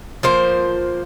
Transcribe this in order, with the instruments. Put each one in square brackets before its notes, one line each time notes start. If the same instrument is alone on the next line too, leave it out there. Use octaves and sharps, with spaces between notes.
[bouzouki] F3 A#3 C5